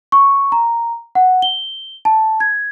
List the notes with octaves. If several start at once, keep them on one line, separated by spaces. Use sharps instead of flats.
C#6
A#5
F#5
G7
A5
G#6